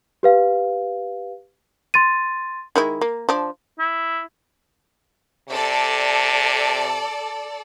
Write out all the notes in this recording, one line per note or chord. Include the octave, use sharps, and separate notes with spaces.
G4 B4 F5
C6 A6 D#7
D#3 G#3 E4
A#3
F3 D4
E4
C3 A4 D5